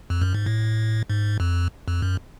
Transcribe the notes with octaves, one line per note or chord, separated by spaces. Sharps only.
F2
F#2
G#2
A2
G#2
F2
F2
F#2